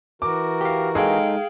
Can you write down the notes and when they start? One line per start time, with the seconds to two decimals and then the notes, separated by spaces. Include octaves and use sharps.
0.22 E3 F#4 A#4 D6
0.61 G4 F5
0.95 G#3 D#4 G#4 A4 F5 G5